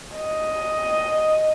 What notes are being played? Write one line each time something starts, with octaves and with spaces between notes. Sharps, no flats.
D#5